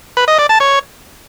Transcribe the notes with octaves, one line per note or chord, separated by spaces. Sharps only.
B4
D#5
D5
A5
C#5